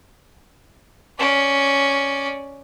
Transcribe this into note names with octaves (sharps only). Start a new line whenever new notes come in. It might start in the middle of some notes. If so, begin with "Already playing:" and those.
C#4 D5